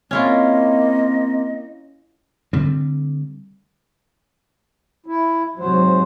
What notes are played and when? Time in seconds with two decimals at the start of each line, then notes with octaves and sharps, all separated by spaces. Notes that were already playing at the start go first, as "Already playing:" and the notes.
0.11 A#3 C4 C#4 E4 F4 D#5
2.53 D3 G3 A3 C4
5.06 E4
5.59 G#2 C3 F#3 C5